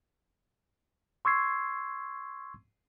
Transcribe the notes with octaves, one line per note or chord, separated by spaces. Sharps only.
C6 C#6 E6 G#6 C7